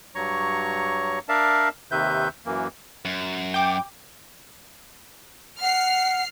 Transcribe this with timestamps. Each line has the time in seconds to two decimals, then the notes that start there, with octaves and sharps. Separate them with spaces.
0.15 G2 F#3 C#5 A#5 C#6
1.29 D4 A#4 D5 E5 F5 A5
1.91 D#2 C3 D#3 B4 E5 G6
2.46 F#2 E3 A#3
3.05 F#2
3.54 G5 D6
5.62 F#5 F6 C7